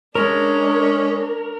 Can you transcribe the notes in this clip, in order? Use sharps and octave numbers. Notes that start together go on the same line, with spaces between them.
G#3 C#4 D4 A#4